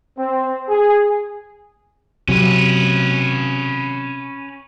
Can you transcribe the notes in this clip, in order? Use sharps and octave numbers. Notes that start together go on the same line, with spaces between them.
C4
G#4
C3 F#3 C#4 B4